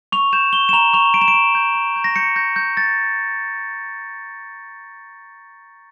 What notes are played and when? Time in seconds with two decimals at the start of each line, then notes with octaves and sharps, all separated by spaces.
0.12 C#6 F7
0.33 G6 E7
0.53 C#6 G7
0.69 E7
0.73 A#5 F7
0.93 C#6 F7
1.14 A#5 D7
1.21 E7
1.28 D7
1.34 C#6
1.55 G6
1.75 A#5
1.96 G6
2.04 A#6
2.16 G6 C#7
2.36 G6 A#6
2.56 G6
2.77 G6 A6